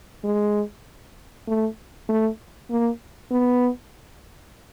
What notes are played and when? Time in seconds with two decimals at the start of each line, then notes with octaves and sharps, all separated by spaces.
0.24 G#3
1.48 A3
2.09 A3
2.70 A#3
3.31 B3